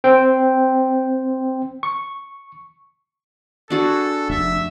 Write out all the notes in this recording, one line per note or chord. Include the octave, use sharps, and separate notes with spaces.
C4 G5
C#6
D4 F#4 G#4 A4
F1 E5